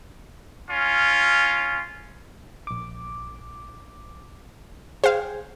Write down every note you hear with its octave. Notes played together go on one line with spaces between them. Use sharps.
C#4 F4
A#1 D6
G#4 C5 F5 G5 G#5